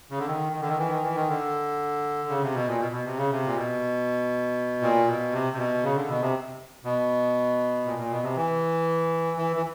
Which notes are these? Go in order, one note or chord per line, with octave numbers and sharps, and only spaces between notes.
C#3
D3
D#3
D#3
D3
D#3
E3
D#3
E3
D#3
D3
C#3
C3
B2
A#2
B2
B2
C3
C#3
C3
A#2
B2
A#2
B2
C3
C3
B2
C#3
D3
B2
C3
B2
A#2
A#2
B2
C3
E3
E3
E3